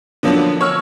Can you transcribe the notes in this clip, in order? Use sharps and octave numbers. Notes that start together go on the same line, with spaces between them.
D3 F3 F#3 A#3 B3 D4
C#5 C#6 E6 F6